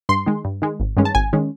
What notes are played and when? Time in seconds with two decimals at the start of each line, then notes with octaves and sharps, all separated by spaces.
0.09 G2 C6
0.26 D#3 G#3
0.45 G2
0.62 D#3 G#3
0.80 G#1
0.97 G2 D#3 G#3 C#4
1.05 A5
1.15 G#1 G#5
1.33 D#3 G#3 C#4